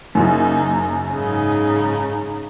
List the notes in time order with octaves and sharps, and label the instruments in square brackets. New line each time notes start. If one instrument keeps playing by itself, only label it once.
[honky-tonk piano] F#1 F#2 [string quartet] A#3 D#4
[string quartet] G#2 C#3 D#4